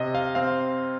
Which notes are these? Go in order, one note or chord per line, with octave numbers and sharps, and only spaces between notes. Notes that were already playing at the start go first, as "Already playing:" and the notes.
Already playing: C3 D#5
F5
C4 F5